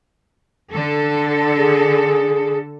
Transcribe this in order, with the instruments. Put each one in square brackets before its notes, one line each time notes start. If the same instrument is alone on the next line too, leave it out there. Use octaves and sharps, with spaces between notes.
[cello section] D3 A4
[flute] G#4